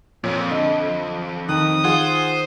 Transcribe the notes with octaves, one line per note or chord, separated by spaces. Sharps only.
F2 A#2 C#5
D3 D#5
D#3 D#6 F#6
F4 G#4 C5 F#5